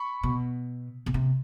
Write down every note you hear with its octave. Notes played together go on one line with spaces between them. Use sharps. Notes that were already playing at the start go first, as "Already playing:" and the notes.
Already playing: B5 C#6
B2
B2
C3